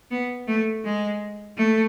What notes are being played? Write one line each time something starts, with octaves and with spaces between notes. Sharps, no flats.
B3
A3
G#3
A3